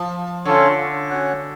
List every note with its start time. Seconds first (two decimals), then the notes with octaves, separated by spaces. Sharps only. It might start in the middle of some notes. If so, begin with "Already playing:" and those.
Already playing: F3
0.45 D3 C#4 F4 A4 C#5
1.10 C#4 F#4 C#5 F#5